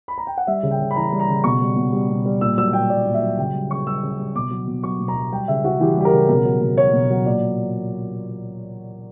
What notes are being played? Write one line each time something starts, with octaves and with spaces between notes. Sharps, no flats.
B5
A#5
G5
F#5
G3 E5
C#3
G5
C#3
B5
E3 A#5
G3
A#5
C#3
B2 C#6
G3
B2
G3
B2
G3
A#2 E6
F#3 E6
A#2 G5
F#3 D5
A#2
E5
F#3
C#3 G5
G3
C#3 C#6
G3 E6
C#3
G3
B2 D6
F#3
B2
F#3 C#6
B2
A#5
F#3
G3 G5
C#3 E5
C#3 F#4
E3 G4
G3 G4
A#4
C#3
B2 A#4
F#3
B2
F#3 C#5
B2
F#3
A#2 D5